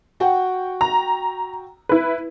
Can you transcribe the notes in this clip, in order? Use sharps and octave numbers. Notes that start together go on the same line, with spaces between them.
F#4 F#5 G5
A#5
E4 B4